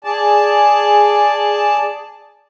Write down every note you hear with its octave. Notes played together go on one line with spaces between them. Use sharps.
G#4 D5 A5